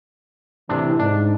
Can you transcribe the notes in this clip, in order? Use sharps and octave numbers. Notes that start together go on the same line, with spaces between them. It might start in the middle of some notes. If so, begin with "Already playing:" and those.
A2 C3 E3 D4
G#2 D4